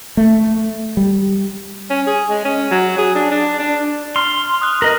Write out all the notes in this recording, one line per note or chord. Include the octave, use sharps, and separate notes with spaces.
A3
G3
C#4
G#4
G#3
C#4
F#3
G#4
D4
D4
D4
C6 F6 F7
D#6 F6 F#6
A#4 D#5 F#7